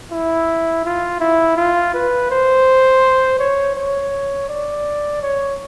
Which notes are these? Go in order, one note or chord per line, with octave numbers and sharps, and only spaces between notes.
E4
F4
E4
F4
B4
C5
C#5
C#5
D5
C#5